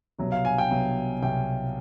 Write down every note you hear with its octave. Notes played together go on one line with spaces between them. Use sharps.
C2 B2 F#3
F5
G#5
G5
C2 B2 F#3
C2 B2 F#3 G5